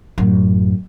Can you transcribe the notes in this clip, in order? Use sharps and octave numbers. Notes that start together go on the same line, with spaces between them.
A1 F#2